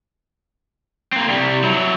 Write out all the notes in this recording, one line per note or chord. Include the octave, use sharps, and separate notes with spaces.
A#3 C4
C3 G3
F#3 E4